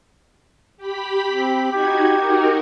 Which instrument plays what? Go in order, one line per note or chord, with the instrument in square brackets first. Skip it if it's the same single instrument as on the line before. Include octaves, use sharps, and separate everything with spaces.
[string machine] G4 B5 B6
[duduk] C4
[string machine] D#4 F#4 G#6 [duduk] G4
[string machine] D#4 F#4 A#4